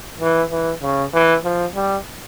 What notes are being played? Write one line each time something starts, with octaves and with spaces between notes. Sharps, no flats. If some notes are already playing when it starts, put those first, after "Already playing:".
E3
E3
C#3
E3
F3
G3